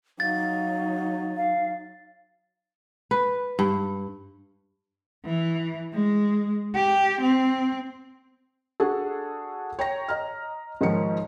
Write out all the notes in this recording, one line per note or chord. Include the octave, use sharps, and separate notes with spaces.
F#3 D#4 F5 A6
F5
B4
G2
E3
G#3
G4
C4
D4 F#4 G#4 A4
C#5 G5 A#5 A#6
D#5 A#5 F6
G#2 D#3 F3 C#5 C#7